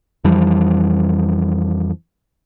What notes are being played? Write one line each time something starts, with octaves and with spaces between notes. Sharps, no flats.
F2 E3 F3 G3